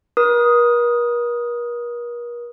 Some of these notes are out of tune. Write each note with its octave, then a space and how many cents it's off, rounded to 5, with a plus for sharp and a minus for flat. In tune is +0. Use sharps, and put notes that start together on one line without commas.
A#4 +45 D#6 +0